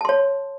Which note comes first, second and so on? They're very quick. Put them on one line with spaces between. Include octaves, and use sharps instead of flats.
A5 C6 C#5